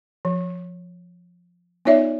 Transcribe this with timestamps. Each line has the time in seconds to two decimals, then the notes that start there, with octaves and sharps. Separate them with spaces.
0.25 F3
1.85 B3 D#4 F4 C#5 D5 E5